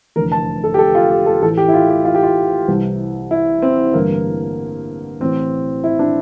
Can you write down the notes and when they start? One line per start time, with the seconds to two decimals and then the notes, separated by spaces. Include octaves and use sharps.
0.16 F1 E2 D3 A#4
0.32 A5
0.64 A4
0.74 G4
0.78 A4
0.95 F4
1.10 G4
1.26 A4
1.42 A1 A2 E3 A4
1.57 G4
1.68 E4
1.74 F4
1.90 G4
2.05 F4
2.15 G4
2.23 F4
2.68 C2 C3 E3
3.31 E4
3.62 C4
3.94 A1 G2 D3 A#3
5.20 A1 A2 E3 C4
5.84 E4
5.99 D4